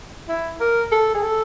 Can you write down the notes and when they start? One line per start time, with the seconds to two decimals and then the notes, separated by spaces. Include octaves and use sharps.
0.29 E4
0.61 A#4
0.92 A4
1.15 G#4
1.23 A4